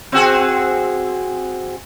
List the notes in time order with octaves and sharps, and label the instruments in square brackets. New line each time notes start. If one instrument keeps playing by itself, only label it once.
[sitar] C4 F#4 G#4